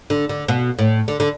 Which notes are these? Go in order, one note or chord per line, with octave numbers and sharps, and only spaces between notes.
D3
D3
B2
A2
D3
D3